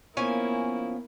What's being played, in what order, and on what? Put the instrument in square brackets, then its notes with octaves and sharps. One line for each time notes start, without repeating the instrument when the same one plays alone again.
[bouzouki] F3 C#4 G#5 [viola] A#3 E4 [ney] B3